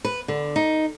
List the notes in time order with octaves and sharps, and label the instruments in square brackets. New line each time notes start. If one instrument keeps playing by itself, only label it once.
[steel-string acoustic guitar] B4
D3
D#4